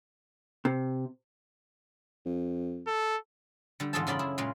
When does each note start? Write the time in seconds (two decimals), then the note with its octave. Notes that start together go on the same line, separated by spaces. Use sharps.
0.65 C3
2.26 F2
2.87 A4
3.80 D3 G3
3.93 E2 G#2 F4 G#4 A4 A5
4.07 F#2 C#3 F4 D5 B5 C6
4.19 E4 G#4
4.38 A#2 C#3 G#3 F4